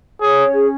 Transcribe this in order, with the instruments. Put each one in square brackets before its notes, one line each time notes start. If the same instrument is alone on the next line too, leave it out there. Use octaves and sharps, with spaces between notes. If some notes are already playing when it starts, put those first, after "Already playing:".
[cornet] G#4 [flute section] C#5
[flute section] C#4
G#4